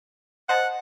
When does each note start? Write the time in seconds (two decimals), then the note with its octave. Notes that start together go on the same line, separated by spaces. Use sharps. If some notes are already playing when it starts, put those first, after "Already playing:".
0.49 C5 D#5 F#5 A5